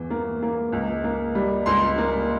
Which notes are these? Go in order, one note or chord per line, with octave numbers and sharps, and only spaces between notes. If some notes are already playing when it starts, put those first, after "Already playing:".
Already playing: E2 E3
A#3
A#3
C#2
A#3
G3
C#2 C6
A#3